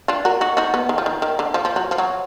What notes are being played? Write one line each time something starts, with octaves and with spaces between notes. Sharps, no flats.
D4 F4
F#4 A#4
D#4 F#4
D#4 F#4
B3
D#3
F3
D#3
D#3
D3
F3
F3
F#3
F3
F#3